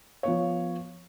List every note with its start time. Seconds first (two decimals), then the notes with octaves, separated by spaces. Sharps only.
0.23 F3 B3 C#5